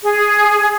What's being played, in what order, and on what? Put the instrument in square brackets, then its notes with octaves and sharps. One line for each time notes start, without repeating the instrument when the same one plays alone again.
[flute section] G#4